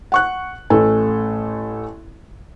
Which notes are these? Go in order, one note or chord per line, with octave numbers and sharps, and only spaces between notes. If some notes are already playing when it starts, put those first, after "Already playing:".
F#5 C#6 F#6
A1 A3 A4 G#5